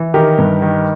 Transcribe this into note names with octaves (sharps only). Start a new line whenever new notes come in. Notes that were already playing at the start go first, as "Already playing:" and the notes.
Already playing: E3
D#3 G4 A#4
G2
D#3